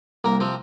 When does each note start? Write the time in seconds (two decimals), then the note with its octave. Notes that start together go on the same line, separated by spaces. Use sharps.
0.24 C2 A#3 A#4
0.40 C3 F3 C4